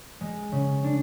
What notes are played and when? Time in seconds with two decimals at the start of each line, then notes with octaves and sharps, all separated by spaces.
0.21 G#3
0.52 C#3
0.84 D4